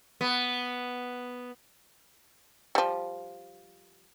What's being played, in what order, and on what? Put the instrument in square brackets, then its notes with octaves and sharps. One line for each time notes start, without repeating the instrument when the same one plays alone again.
[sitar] B3
[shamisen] F3 G3